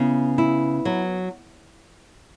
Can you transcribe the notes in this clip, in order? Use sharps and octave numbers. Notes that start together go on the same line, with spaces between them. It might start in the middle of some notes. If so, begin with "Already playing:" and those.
Already playing: C#3 B3 E4
E4
F#3